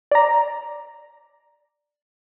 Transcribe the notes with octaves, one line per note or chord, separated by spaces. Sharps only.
D5 A#5